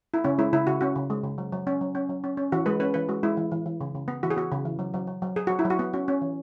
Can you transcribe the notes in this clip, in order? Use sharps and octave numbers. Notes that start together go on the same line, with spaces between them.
E4
C#3 C#4
G#3 E4
C#3 E4
C#3 F#4
C#4 F#4
C#3
G#3
C#3
F#3
F#3
C#4
F#3
C#4
F#3
C#4
C#4
E3 F#4
G#3 B4
C#4 B4
E3 B4
G#3 F#4
G#3 E4
E3
E3
E3
C#3
C#3
B3
E3 F#4
G#4
B3 F#4
C#3
E3
F#3
F#3
F#3
F#3
F#3 G#4
F#3 F#4
E4
F#3
F#4
B3
C#4 F#4
C#4
E3